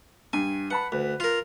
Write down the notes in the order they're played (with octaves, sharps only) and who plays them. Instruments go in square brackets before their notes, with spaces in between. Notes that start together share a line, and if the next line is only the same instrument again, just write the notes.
[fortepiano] G2 [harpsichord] G#5
[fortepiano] B4 A5 B5 [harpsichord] F#5
[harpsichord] D2 [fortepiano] B4
[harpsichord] F4 A#4